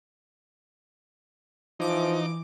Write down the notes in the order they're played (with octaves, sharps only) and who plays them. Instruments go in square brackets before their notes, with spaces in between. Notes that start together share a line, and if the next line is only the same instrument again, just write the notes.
[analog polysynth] E3 D6 [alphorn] F3 [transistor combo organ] D#4